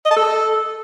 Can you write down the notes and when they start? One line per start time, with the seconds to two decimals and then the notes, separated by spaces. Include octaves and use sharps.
0.05 D#5
0.11 A5
0.17 A4